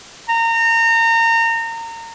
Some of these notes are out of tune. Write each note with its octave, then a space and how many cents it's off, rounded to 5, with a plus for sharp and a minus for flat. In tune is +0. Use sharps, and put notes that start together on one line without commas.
A#5 -30